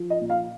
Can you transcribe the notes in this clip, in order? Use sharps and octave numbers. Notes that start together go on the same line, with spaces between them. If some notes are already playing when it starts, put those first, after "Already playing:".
Already playing: F3
D#5
A#2
F5